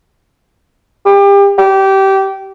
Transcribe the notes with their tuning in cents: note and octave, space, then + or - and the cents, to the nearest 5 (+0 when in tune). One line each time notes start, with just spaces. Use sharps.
G4 +30
G4 -20